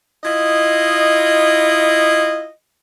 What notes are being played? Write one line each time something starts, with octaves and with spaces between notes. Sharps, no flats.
E4 F4 D#5